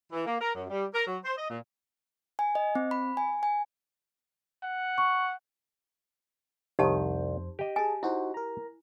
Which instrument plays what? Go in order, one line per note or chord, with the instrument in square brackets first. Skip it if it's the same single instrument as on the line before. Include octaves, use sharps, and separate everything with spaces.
[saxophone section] E3
A#3
A#4
F#2
G3
A#4
F#3
C5
D#5
A#2
[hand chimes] G#5
D#5
C4
B5
G#5
G#5
[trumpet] F#5
[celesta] C#6
[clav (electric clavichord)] C2 D#3 [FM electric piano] F2 C5 [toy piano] D#4 G4 A5
[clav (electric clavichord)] G4 D#5
[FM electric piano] G#4 A5 [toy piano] G#5
[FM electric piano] D#4 F#4 C5 [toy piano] E4
[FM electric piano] A#4 A#5